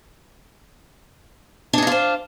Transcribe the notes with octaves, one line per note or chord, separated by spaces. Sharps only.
D4 D#4 F4 G#4 C5